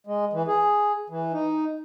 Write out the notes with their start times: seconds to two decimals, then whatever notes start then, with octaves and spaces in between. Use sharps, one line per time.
0.07 G#3
0.33 E3
0.48 G#4
1.10 E3
1.33 D#4